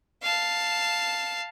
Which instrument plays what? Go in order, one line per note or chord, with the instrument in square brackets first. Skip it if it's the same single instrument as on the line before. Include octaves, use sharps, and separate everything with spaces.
[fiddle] F5 A5